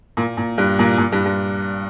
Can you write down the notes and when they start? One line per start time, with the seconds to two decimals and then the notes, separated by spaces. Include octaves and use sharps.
0.17 A#2
0.37 A#2
0.58 G2
0.79 A#2
0.98 A#2
1.12 G2
1.26 G2